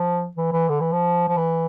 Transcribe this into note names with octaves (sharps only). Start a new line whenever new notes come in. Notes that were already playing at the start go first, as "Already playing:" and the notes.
Already playing: F3
E3
E3
D3
E3
F3
F3
E3